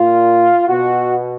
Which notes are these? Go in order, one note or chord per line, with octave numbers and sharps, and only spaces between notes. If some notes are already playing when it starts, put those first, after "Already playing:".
Already playing: A#2 F4
B2 F#4